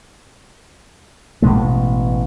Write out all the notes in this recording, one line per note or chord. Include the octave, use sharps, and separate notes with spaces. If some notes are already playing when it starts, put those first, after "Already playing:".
A1 B2 G#3 A3